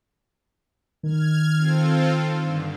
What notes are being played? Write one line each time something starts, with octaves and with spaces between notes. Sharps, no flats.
D#3 F6 G#6
C4 F4 A4
G2 D3